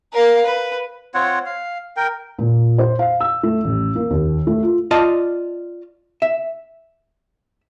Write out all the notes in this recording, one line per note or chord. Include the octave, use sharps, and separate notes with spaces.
A#4 F5
B4
C4 F4 C#5 F#5
F5
A#4 G5
A#2
C5
F5
E6
A3
A1
A#3
D#2
A3
F4
F4 D5 D#5 A5
E5